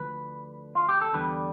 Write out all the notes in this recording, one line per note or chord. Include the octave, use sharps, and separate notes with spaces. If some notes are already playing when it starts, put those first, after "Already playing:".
Already playing: D2 D3 F3 B4
F4
G4
A4
E2 D3 G3 B4